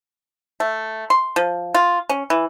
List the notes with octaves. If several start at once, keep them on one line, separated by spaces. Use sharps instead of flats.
A3
C6
F3
F4
C#4
E3